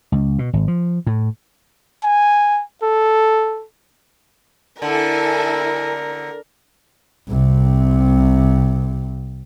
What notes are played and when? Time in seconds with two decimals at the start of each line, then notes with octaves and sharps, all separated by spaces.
0.12 C#2
0.39 B2
0.53 G#1
0.68 F3
1.07 A2
2.04 G#5
2.83 A4
4.82 D3 E4 A4 A#4 G#5
7.28 C2 C3